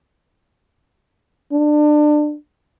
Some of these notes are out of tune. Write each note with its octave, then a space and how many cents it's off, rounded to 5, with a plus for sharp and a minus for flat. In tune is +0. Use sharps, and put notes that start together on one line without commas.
D4 +25